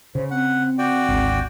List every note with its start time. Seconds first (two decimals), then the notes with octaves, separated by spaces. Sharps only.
0.15 C#3 C5
0.31 C4 F#5
0.78 F#4 D5 G5
1.09 G#1 D2